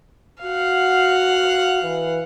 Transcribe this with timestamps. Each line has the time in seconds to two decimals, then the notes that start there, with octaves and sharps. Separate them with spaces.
0.44 F#4 F5 F#5
1.83 E3